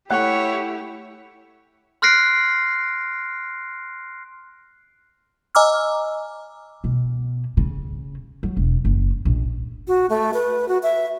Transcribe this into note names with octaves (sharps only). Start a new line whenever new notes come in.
A3 E4 G4 C#5 F#5 F#6
C6 F6 F#6 A#6 C7 D7
D#5 G#5 A#5 D6 E6 F6
B2
C#3
F#3
E1
F#1
A#1
F#4
A3
B4
F#4
E5